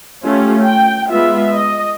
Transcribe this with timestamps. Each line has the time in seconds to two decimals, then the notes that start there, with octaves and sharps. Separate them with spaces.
0.24 A3 C#4 F4 G4
0.64 G5
1.12 G#3 B3 F4 E5
1.54 D#5